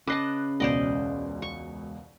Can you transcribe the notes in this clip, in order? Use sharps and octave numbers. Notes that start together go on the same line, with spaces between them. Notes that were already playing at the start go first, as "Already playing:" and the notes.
C#3 B4 D#5 A5 D6 F#6 C7
E1 C#2 B2 C5 D5 D#5
C#6